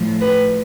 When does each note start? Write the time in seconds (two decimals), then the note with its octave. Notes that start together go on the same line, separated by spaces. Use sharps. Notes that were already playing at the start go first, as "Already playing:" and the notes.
Already playing: A2 F3
0.20 B4